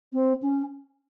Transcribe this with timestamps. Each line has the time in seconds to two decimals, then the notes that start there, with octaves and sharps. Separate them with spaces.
0.13 C4
0.42 C#4